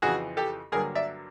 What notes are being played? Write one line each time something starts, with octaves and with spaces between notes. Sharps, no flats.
F2 C#3 E3 F#4 G#4
G4 A4
G2 D3 F#3 A#3 G#4 A#4
D5 E5